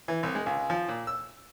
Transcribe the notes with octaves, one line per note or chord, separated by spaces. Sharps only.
E3
C2
G#3
C#2
F3
A#2
E6